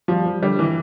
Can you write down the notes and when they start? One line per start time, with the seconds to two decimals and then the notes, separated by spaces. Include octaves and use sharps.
0.08 F3 G3
0.26 F3
0.42 D3 G3
0.59 E3